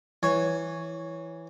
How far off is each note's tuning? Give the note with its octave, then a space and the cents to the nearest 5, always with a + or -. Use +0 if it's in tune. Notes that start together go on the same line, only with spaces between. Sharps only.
E3 +0 C#5 +5